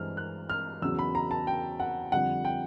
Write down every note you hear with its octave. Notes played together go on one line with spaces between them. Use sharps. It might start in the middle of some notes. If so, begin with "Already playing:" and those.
Already playing: G2 E3 G#3 C4 F6
F#6
F6
E2 C#3 F#3 E6
B5
A#5
A5
G5
F#5
F2 D3 G3 F#5
G5